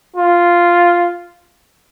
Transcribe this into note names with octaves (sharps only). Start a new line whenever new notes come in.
F4